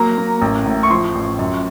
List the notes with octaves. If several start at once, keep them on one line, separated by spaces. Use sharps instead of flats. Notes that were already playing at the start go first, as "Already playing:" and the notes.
Already playing: F#3 A#3 A#5
A#3
A1
A2
C#6
F3 C6
A1
F#2